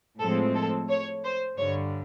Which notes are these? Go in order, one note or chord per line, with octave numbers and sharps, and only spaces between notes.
A2 F3 G#3 C4 A4
A4
C#5
C5
G2 D3 G3 C#5